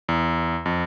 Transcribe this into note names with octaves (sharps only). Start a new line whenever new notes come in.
E2
F2